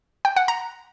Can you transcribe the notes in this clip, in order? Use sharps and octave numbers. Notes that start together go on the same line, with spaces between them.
G5
F#5
A#5